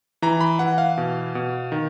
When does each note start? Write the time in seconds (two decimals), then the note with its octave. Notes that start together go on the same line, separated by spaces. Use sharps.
0.22 E3 A#5
0.41 B5
0.59 E3 F#5
0.78 F5
0.98 B2
1.35 B2
1.72 D#3